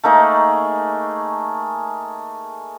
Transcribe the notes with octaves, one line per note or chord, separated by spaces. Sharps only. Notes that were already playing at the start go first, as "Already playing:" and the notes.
A3 A#3 D#4 G#4